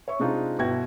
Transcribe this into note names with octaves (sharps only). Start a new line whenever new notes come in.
C#5 E5 C#6
C3 G#3 C4 D4 D#4 F4
G1 B2 E4 F#4 G5 G#6